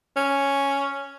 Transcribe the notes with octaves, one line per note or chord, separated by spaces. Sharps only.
C#4